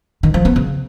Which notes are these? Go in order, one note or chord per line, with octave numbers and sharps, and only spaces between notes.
D#3
F3
B3
C#3